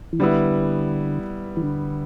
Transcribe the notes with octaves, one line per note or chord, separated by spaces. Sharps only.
E3
D3 G3 B3 E4
E3
D3